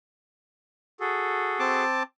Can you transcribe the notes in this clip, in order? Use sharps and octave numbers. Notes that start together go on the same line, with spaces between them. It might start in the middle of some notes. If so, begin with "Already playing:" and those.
F#4 G#4 A4
C4 A5 D6